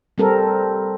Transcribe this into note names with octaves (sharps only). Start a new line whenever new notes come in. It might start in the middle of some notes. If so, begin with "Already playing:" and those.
G3 C4 A4 A#4